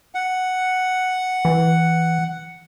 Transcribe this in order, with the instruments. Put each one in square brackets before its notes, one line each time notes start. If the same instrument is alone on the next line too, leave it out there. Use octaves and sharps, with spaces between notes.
[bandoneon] F#5
[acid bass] E3